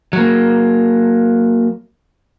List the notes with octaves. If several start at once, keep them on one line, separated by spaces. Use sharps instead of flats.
F#3 A#3